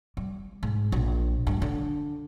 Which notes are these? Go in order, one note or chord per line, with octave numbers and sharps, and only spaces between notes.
G3
G#2
A#1
G2
D3